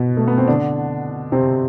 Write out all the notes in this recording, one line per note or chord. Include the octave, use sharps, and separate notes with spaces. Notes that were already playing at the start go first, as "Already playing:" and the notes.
Already playing: B2 B3
A3
B3
C4
D3 D4
C3 C4